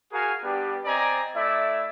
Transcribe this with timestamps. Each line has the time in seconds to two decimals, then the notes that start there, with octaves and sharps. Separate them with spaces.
0.12 F#4 G#4 A#4 F5 G#5
0.43 G3 B3 D4 G4
0.85 C4 D5 D#5 G#5 A#5
1.35 A3 E4 D5 E5